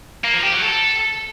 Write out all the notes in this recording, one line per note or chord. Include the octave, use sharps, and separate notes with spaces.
A#3
F3
G4
F#3
A4